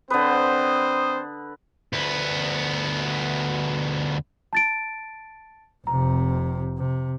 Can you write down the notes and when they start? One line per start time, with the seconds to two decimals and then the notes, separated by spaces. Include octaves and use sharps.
0.10 D3 C4 B4 C5 D#6
1.93 D2 B3
4.53 A5 A6 D7
5.87 F1 C3 A#5
6.79 C3